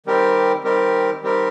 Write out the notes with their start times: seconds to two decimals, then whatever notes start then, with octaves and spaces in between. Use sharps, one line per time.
0.06 D#3 G3 C4 G4 A#4
0.64 D#3 G3 C4 G4 A#4
1.22 D#3 G3 C4 G4 A#4